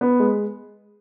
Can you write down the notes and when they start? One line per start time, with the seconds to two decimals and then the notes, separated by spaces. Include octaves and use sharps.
0.01 B3
0.20 G#3